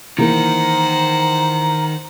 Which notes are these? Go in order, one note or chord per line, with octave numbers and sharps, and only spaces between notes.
D#3 E3 A#3 C5 F#5 A#5